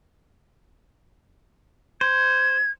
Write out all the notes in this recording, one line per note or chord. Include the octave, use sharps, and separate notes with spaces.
C5 G#6